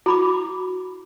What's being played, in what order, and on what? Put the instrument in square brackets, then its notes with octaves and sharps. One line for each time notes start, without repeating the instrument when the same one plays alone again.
[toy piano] E4 B5 D6 [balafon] F#4